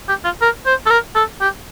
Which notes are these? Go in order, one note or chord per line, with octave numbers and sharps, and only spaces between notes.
G4
F4
A#4
C5
A4
A#4
A4
G4